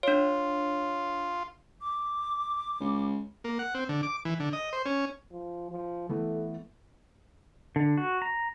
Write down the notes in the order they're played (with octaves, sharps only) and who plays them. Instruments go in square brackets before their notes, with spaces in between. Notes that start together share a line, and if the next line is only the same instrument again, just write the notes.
[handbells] D4 C#5 [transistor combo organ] F4
[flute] D6
[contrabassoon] C#2
[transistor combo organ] A#3
F#5
C4
D3
D6
E3
D3
D#5
C5
C#4
[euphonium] F3
F3
[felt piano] E3 A3 B3 [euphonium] A4
[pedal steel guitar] D3
F#4
A#5